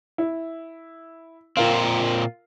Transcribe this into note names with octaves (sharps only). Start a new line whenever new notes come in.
E4
A#2 C4 F4 A#4 F5